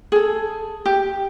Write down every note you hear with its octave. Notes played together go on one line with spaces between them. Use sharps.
G#4 A4
G4